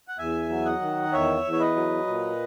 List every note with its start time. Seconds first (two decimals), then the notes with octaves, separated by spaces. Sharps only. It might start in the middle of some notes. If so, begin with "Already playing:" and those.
0.08 F#5
0.18 E2 E5 G#5
0.49 F#3
0.65 D#5 F#5
0.81 D#3
1.12 E2 C#5 E5
1.45 E2
1.53 C#5
1.60 B4 D#5
1.76 F#3
2.07 A#2